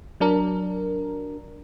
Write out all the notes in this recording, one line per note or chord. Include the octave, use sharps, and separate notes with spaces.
F#3 D4 A#4